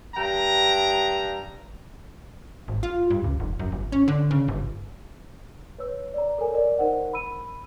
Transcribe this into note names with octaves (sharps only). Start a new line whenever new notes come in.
G2 G5 A#5
G#1
F4
G2
C#2
F1
F#2
G1
C#4
D3
C#3
G1
B4 C#5 E6
D5 A#5
A4 A#4 C#5 G#5
A#4 D5 D#5
D#4 A#4 C5 F#5
B5 E6 D#7